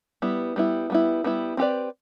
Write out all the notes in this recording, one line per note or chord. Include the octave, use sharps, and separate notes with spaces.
G3 B3 E4
G3 B3 E4
G3 B3 E4
G3 B3 E4
C4 E4 G4 B4 D5